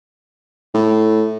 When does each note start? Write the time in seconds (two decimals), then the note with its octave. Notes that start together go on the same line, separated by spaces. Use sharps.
0.74 A2